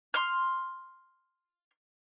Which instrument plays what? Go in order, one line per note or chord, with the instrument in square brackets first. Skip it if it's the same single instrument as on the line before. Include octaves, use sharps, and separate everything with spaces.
[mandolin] C6 F6